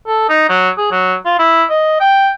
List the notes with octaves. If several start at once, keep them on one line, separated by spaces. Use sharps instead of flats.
A4
D#4
F#3
G#4
F#3
F4
E4
D#5
G5